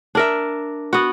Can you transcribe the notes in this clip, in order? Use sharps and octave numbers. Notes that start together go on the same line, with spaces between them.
D4 A#4 E5
B3 F#4